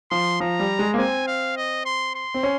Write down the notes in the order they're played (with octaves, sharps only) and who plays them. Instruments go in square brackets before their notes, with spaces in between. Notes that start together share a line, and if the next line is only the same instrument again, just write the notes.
[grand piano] F3 [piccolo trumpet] C6
[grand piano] F3 [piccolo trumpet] A#5
[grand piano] G3
G#3
A#3
[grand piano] C4 [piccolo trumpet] G#5
[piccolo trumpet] F5
D#5
C6
C6
[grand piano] C4
C#4